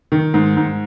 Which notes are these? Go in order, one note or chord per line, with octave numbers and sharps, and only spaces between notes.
D#3
G#2
G#2